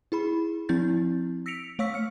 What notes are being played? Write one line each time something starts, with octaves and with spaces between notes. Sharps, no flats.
E4 G#4 B5
F3 C4 E4 G6 A6
E6 A#6 B6 C#7 D7 F7
A3 C#5 F5 C#6 E6 B6
F6 C#7